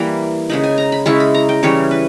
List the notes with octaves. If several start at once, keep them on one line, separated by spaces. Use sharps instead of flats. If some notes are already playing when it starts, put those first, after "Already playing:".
Already playing: E3 G3 A#3 B5
C#3 G#3 D#4 B5
G#5
A#5
B5
C#3 G#3 C#4 E4 C#6
B5
A#5
G5
C#3 E3 G3 C#4 C#5
B4